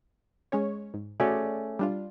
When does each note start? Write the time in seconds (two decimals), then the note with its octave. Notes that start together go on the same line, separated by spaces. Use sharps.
0.52 G#3 C#4 C#5
0.94 G#2
1.20 A3 C#4 F#4 G#4 D5
1.79 G3 D4 F4